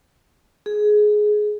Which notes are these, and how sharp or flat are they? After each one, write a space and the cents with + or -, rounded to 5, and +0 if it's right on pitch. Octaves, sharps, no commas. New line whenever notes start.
G#4 +15